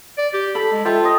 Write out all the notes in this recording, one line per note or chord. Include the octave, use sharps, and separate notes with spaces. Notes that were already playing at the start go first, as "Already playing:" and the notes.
D5
G4
A4 B5
G#3
F4 A4 E5 G5
D#5 C6